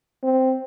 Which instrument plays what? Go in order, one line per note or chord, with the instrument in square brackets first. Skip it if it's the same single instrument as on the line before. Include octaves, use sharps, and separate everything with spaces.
[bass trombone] C4